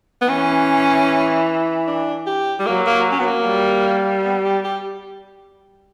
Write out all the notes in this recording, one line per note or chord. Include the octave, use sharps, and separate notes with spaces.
B3
E3 C#4
D4
G4
G3
F#3 A#3
A#3
C#4
B3
A#3
G3
B3
G4
G4